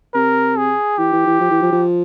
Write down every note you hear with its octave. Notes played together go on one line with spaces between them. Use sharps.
C3 A#4
G#4
E3 G4
E3
E3
F3
E3
F3
F3